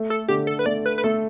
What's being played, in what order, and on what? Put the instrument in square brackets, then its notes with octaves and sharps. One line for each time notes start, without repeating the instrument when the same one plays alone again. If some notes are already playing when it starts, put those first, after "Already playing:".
Already playing: [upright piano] A3
[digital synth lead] A4
[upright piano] D3 [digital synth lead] G4
[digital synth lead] A4
B4
[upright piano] A3 [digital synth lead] D5
[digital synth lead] B4
B4
[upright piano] A3 [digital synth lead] A4